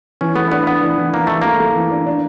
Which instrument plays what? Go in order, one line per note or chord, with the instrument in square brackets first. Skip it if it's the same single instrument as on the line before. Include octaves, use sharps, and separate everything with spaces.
[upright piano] E3 [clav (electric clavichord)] C#4
[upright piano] A3 [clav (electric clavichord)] B3
[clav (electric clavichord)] B3 [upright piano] D4
[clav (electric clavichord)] B3 [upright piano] D4
[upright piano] E3
E3
[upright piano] E3 [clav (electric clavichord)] A#3
[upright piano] E3 [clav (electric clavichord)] A3
[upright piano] A3 [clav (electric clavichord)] A#3
[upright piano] A3
E3
D4
D4